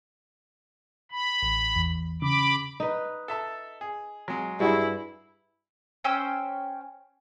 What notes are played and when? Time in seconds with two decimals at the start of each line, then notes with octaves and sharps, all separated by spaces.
1.12 B5
1.42 A1
1.76 E2
2.22 C#3 B5 D6
2.80 D#4 B4
3.28 A4 E5 A5
3.81 G#4
4.28 F#3 G#3
4.60 G2 G3 E4 F#4 G#4
6.04 C#4 C5 G5 E6